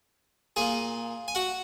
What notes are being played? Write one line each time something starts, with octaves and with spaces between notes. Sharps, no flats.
A#2 A#3 G#4 G#5
G#5
F#4 F#5